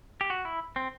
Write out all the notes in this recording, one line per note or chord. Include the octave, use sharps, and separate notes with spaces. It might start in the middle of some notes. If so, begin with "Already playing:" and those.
G4
F#4
E4
C4